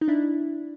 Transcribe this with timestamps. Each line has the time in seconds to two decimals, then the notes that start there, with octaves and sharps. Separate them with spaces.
0.01 D#4
0.08 D4 E4